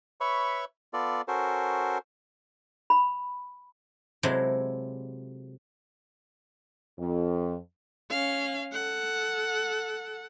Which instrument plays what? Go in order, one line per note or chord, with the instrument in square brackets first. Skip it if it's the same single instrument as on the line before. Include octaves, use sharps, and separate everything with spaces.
[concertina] B4 C#5 E5 B5 C#6
B3 F4 A4 D5
C#4 F#4 A4 A#4 C5
[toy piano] B5
[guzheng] C3 F#3 G#3 E4 A4 C5
[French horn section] F2
[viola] C#4 F5
A4 F#5